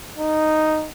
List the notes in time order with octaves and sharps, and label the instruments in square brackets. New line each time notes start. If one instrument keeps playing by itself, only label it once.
[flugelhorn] D#4